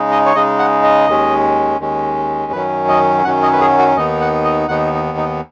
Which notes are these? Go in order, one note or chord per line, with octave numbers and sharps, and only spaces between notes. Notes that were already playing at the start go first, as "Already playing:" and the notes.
Already playing: C#3 G#3 D#4
D#5
C#5
C#3 G#3 D#4 D#5
F#5
D#5
D#2 D#3 G#3 C#4
D#2 D#3 G#3 C#4
F#2 D#3 F#3 C#4 B4
D#5
F#2 D#3 F#3 C#4 F#5
D#5
B4
G#4
F#4
D#2 D#3 B3 D#4 D#5
F#5
D#5
D#2 D#3 B3 D#4 F#5
D#4
D#4